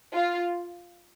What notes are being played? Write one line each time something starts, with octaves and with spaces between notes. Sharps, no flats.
F4